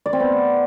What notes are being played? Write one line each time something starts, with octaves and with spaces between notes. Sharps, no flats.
D5
C4
B3